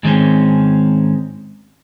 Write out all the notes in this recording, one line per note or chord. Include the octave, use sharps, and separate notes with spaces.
G#2 D#3 G3 G#3 C4 C#4